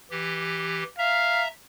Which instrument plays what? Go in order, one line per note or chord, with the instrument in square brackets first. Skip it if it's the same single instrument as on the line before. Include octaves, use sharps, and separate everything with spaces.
[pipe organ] E3 G4
[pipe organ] E5 A#5 [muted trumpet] F5